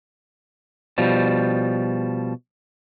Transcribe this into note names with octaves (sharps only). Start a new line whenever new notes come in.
B2 F3 G3